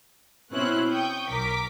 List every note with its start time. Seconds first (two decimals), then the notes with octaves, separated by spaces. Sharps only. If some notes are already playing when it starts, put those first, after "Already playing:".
0.51 B2 C4 C#4 E4 C5 F#6
0.89 G5 C#6 D#6 G6
1.29 B1 A#4 D6 B6